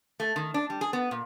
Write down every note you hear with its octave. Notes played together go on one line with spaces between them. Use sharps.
A3
D#3
D4
G3
G#4
B3
A#2